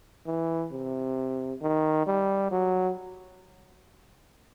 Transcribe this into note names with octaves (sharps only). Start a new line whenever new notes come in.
E3
C3
D#3
G3
F#3